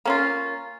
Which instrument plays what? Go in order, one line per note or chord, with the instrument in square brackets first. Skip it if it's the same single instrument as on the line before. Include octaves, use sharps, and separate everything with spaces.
[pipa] A#3 C#4 F4